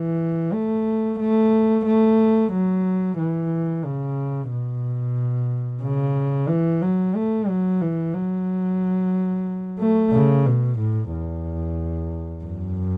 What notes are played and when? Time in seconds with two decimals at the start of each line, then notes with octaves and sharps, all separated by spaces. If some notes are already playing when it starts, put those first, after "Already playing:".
Already playing: E3
0.53 A3
1.20 A3
1.86 A3
2.52 F#3
3.18 E3
3.84 C#3
4.50 B2
5.82 C#3
6.48 E3
6.82 F#3
7.16 A3
7.48 F#3
7.81 E3
8.14 F#3
9.79 A3
10.13 C#3
10.46 B2
10.79 A2
11.12 E2
12.44 F#2